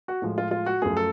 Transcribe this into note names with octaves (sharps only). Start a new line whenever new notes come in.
F#4
A2 F3 G#3
F4
F4
F#4
F#2 F3 A3 G#4
A4